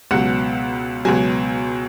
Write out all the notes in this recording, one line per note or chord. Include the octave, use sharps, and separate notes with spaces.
C#2 B2 F#3 F#5
C#2 B2 F#3 G#5